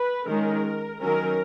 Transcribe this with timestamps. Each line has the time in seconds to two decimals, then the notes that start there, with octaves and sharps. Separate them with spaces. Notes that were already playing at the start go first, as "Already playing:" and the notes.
Already playing: B4
0.28 D#3 G#3 C#4 A#4
1.00 D#3 F#3 C#4 A#4